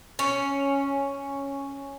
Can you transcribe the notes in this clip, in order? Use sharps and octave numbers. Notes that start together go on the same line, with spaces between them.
C#4